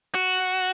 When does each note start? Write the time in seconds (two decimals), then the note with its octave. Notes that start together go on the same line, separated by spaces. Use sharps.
0.14 F#4